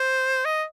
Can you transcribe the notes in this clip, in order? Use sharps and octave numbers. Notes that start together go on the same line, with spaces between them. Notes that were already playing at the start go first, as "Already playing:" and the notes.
Already playing: C5
D#5